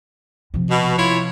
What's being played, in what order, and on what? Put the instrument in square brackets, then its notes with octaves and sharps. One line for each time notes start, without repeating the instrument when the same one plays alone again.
[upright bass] C3 F3
[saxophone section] B2
E4 F4 C#5